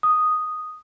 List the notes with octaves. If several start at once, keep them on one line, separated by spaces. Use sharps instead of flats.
D#6